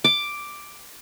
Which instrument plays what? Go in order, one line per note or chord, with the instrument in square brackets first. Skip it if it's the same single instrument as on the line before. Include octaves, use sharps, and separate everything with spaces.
[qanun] D6